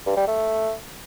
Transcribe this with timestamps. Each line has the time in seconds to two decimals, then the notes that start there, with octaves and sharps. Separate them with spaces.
0.06 G2
0.17 G3
0.27 A3